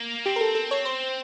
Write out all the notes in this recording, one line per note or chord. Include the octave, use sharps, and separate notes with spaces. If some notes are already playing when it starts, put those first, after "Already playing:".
Already playing: A#3
C4 G4
A#4
A4
A4
C#5
C5